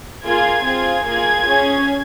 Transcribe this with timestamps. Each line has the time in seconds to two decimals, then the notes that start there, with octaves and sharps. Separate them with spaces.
0.24 A#3 F4 G#4 G#6
0.64 C4 F4 G#4
1.05 A#3 F4 G#4 G#6
1.46 C#4 G#4